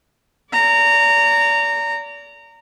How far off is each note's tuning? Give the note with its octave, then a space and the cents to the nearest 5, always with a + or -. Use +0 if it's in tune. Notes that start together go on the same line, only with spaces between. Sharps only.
D5 -35 A#5 -20